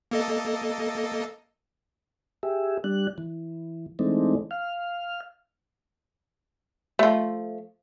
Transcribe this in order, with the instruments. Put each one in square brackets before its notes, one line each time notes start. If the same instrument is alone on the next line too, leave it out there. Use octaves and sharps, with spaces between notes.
[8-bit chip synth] A#3 A4 D#5
[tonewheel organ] G4 G#4 E5
G3 D4 F#6
E3
E3 G#3 A3 C4 D4 D#4
F5 F6
[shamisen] F3 A3